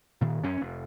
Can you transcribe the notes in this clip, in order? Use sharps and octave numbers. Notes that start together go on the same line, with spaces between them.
A#2 D#3
F#2 C#4
F1